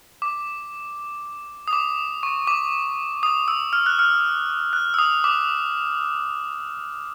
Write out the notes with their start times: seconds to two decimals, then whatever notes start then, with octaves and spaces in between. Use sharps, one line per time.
0.22 D6
1.68 D#6
1.73 D6
2.23 C#6
2.47 D6
3.23 D#6
3.48 E6
3.73 F6
3.86 F#6
3.99 F6
4.73 F#6
4.94 E6
4.99 D#6
5.24 D6